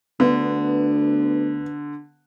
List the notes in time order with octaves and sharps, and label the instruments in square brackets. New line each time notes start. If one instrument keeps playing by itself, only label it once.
[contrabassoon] D2 [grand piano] D3 [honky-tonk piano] B3